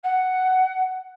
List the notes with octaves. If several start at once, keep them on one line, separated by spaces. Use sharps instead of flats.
F#5